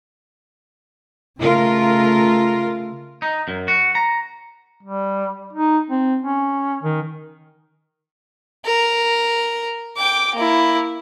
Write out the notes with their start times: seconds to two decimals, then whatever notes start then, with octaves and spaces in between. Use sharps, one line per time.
1.40 C#3 A3 F4 A#4
3.22 D#4
3.48 F#2
3.68 F#4
3.95 A#5
4.83 G3
5.53 D#4
5.90 C4
6.22 C#4
6.83 D#3
8.65 A#4
9.97 G5 D6
10.35 A#3 E4